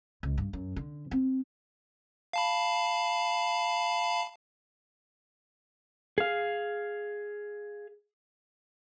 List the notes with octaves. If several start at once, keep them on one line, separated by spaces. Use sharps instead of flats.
C#2
G2
F#2
D3
C4
F5 A5 B5
G#4 F5